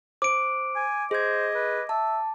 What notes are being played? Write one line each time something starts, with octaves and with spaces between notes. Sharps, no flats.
C5 D6 D7
G#5
G#4 C5 D#5 G#6
B4
E5 A5